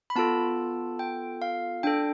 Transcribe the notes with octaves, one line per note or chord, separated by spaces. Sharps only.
B5
B3 F4 A4 A5
G5
F5
D4 A4 G5